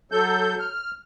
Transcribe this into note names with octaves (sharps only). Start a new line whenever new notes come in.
F#3 A4 G6
F6